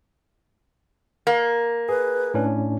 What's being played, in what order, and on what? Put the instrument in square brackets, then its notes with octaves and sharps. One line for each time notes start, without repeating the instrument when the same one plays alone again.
[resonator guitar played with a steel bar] A#3
[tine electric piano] G#4 [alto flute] B4
[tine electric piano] A2 C#4 D4